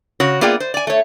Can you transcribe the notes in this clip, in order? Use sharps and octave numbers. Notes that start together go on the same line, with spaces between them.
C#3 F#4 C#5
A#3 B3 F4 G#4 D5 G5
C5
D5 G#5
A3 C#5